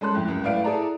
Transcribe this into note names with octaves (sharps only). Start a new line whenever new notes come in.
G#3 C#4 A4 C6 F#6
F2 A2
C#2 F#2
A2 B4 D5 F5 D7
E4 G#4 A4 D5 A#5